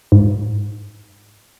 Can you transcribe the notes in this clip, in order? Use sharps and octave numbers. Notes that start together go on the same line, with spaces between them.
G#2